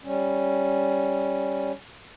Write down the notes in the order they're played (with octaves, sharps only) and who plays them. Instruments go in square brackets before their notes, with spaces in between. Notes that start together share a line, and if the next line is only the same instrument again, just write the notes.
[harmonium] G3 C#4